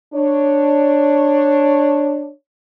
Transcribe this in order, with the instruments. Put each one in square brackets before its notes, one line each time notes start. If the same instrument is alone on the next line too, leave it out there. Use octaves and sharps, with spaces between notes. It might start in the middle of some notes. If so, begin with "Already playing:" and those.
[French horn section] D4 C#5